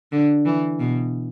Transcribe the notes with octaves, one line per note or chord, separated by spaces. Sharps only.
D3
E3
B2